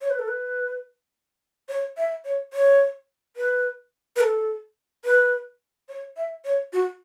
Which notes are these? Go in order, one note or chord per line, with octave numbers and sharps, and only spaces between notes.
C#5
B4
A4
B4
C#5
E5
C#5
C#5
B4
B4
A4
B4
C#5
E5
C#5
F#4